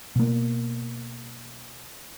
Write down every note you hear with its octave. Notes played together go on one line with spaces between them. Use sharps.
B2 A#3